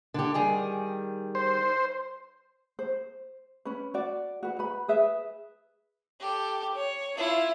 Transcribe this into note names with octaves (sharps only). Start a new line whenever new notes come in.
D3 G4
D#3 G3 G#4
C5
C5
C#4 B4
F#4 D5
F#4 B4
B4 B5
G#4 B4 E5
G4 A4
C#5
E4 F4